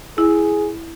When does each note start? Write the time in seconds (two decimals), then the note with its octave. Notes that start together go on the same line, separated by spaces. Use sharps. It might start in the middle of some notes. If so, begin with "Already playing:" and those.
0.18 E4 G#4